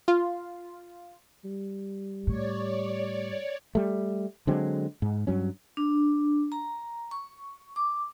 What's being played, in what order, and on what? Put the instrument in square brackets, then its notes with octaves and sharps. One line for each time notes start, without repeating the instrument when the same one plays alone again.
[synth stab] F4
[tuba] G3
[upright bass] A2 [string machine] C#5 D5
[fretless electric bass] G3 A3
D3 F#3 G#3 C4
G#2
G2 F#3 C#4
[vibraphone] D4
A#5
C#6
D6